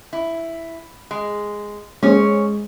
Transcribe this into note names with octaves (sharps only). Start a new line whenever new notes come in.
E4
G#3
G#3 C#4 C5 C#5